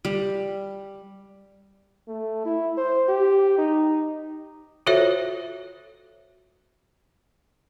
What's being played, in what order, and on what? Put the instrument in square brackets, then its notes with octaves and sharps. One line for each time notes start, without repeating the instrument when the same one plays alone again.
[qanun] G3
[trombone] A3
E4
C5
G4
D#4
[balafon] F4 F#4 A4 C5 C#5 E5